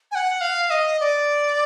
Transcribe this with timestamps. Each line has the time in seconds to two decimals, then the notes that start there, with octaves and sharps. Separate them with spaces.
0.11 G#5
0.15 F#5
0.41 F5
0.70 D#5
1.00 D5